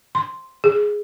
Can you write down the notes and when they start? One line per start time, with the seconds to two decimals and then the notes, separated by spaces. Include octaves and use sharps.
0.15 C6
0.64 G#4